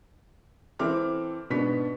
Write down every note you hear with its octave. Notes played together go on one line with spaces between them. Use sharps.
E3 C4 A4 E5 D6 F6
G#2 B2 B3 D4 B6